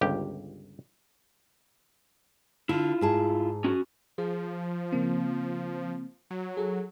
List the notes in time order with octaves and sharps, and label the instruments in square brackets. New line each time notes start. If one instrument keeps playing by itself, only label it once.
[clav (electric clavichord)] G1 C#2 G4
[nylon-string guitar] D3 [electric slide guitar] E4 F4
[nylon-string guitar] G#2 G#4 A5
[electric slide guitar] C#4 F#4
[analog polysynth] F3 [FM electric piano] G#4
[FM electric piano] C#3 A#3 C4
[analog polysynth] F#3
[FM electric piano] G#4 A4